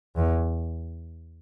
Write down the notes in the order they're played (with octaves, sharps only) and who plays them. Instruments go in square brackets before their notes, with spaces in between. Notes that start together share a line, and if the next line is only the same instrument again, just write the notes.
[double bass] E2